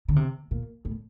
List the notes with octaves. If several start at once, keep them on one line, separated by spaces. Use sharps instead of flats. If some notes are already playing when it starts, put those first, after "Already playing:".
D3
C3
A#2
A2